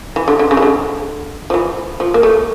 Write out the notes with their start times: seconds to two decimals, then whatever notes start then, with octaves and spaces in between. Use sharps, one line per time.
0.16 E3
0.28 D3
0.39 D3
0.51 C#3
0.57 E3
0.62 D3
1.50 F3
1.54 E3
2.00 F3
2.14 A#3
2.23 A3